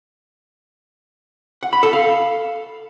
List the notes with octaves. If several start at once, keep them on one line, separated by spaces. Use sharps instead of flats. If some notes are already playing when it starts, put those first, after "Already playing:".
F#5
B5
A4
F5